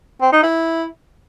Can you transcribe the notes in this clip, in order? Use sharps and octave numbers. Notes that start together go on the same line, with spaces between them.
C4
D#4
E4